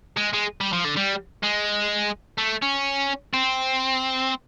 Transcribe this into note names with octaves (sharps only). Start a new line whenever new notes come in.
G#3
G#3
G3
F3
D3
G3
G#3
A3
C#4
C4